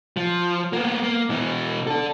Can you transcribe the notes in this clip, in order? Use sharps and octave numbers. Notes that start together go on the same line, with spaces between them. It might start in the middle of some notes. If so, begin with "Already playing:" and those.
F3
A#3 B3
A#3
B2 E3
D4 A4